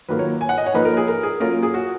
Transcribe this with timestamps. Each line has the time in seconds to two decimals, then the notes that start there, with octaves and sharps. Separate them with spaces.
0.09 D#3 F#3 A#3 F4 B4
0.19 C#5
0.41 G#5
0.49 F#5
0.58 D#5
0.66 C#5
0.74 F3 A#3 D#4 B4
0.85 A#4
0.97 G#4
1.08 A#4
1.23 G#4
1.40 F#3 A#3 C#4 F4 A#4
1.63 G#4
1.74 F#4